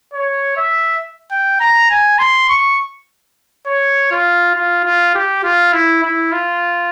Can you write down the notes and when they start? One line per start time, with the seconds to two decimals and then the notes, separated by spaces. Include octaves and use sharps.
0.13 C#5
0.57 E5
1.31 G5
1.60 A#5
1.90 G#5
2.19 C6
2.49 C#6
3.67 C#5
4.11 F4
4.55 F4
4.84 F4
5.15 G4
5.43 F4
5.73 E4
6.03 E4
6.32 F4